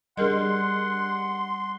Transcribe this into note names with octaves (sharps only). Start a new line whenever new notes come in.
G3 D4 G#4 A#4 D#5 F#5 C6